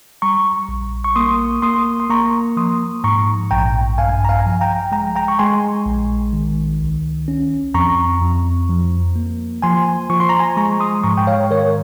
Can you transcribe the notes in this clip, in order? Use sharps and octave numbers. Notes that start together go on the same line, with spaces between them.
G3 A#5 C#6
A#1
C#6
A#3 C6 D#6
A#3 C6 D#6
C6
A#3 A#5 C#6
F3 C6 D#6
G#2 A#5 C#6
A#1 G5 A#5
G2 F5 G#5
A#5
F5 G#5
F3
G5 A#5
G#3 G5 A#5
G5 A#5
C#6
G#3 G#5 C6
A#1
D#3
C#2
C#4
F2 A#5 C#6
F2
F3
A#3
F3 G#5 C6
F3 C#6
C6
A#5
G#5 C6
G#3 A#5 C#6
C6 D#6
G#2 A#5 C#6
G5
C#5 F5
D#3 A#4 C#5